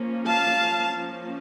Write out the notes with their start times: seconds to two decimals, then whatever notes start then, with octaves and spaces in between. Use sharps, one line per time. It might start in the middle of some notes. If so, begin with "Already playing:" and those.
Already playing: F3 A#3 C#4
0.26 F5 A5
0.94 F3 A#3 C#4